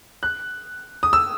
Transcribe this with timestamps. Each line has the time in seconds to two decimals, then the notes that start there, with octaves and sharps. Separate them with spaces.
0.23 F#6
1.03 D#6
1.13 E6